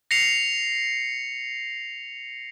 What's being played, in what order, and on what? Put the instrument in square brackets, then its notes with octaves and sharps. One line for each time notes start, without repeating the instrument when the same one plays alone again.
[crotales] A#6 C7 C#7 F7